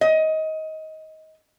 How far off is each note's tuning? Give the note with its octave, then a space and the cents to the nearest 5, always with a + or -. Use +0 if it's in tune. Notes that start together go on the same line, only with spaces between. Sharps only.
D#5 +20